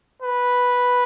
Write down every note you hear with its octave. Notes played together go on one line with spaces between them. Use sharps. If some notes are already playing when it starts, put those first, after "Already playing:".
B4